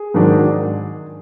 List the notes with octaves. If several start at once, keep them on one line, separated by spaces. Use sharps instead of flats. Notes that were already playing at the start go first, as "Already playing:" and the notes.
Already playing: G#4
G#2 D#3 F#3 D4